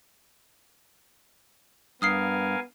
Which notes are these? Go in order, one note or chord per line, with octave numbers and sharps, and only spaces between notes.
G2 B3 A#4 F5 G#5 D#6 F6 C7